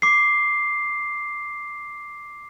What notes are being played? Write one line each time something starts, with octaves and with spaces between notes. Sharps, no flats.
D6 C7